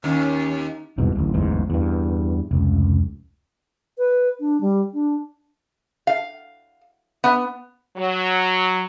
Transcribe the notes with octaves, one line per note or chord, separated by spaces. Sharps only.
D#2 C#4
E1 C2 G#2 B2
D1 A1
D1 A1 E2 G#2
E2 G2
F1 C#2
B4
D4
G3
D4
F5
B3
F#3